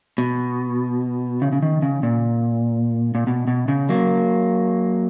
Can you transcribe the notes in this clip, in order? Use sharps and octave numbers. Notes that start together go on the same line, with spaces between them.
B2
C#3
C#3
D#3
C#3
A#2
A#2
B2
B2
C#3
F#3 A#3